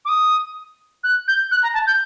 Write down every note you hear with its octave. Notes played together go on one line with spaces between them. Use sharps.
D6
D#6
F#6
G6
F#6
A#5
A5
G6